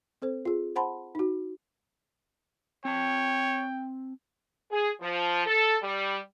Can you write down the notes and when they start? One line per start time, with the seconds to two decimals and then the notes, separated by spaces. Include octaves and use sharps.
0.22 C4 A4 C5
0.45 F4 G#4
0.76 C5 F#5 A5 B5 C6
1.15 D#4 F#4
2.85 C4 C#5 G5 A5
4.72 G#4
5.01 F3
5.46 A4
5.82 G3